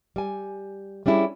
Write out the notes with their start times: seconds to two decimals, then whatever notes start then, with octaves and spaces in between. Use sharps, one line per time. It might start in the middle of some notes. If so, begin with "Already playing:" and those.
0.16 G3 G#5
1.06 G3 C#4 D4 E4 G#4